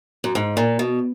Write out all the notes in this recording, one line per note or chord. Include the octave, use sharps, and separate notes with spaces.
F#2
G#2
A#2
B2